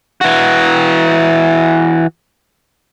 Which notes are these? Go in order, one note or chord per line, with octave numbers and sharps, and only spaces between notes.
E3 F#4